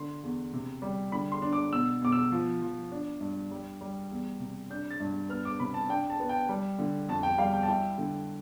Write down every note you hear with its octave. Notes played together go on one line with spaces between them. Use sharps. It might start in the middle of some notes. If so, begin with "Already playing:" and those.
Already playing: D3 C6
E2
C3
G3
D3 B5
C6
D4
D6
B2 E6
B2 D6
E6
F3
F3
D4
G2
G3
G3
E2
C3
D4 G6
A6
G2
B3 F6
D6
C3 B5
A5
D4 G5
A5
B3
G5
G3
D3
F2 A5
G5
G3 F5
G5
A5
E4 G5
D3